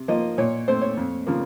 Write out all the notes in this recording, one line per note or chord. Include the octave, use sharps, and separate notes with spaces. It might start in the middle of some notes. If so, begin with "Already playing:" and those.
Already playing: C3
F3 A#3 D#5
A#2 C#5
A3 C4 C5
C#5
F2
C#3 F3 A#3